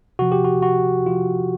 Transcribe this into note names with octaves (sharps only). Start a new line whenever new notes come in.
C3 F3 F#4
G4
F#4
F#4
C3 F3 F4